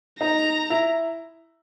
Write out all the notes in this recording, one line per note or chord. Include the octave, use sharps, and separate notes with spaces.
D#4 A#5
E4